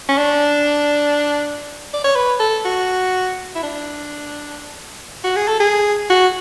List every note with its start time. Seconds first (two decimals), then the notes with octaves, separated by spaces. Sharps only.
0.08 C#4
0.18 D4
1.94 D5
2.04 C#5
2.15 B4
2.40 A4
2.65 F#4
3.55 E4
3.63 D4
5.24 F#4
5.36 G#4
5.48 A4
5.60 G#4
6.10 F#4